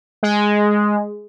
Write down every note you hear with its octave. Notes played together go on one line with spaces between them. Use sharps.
G#3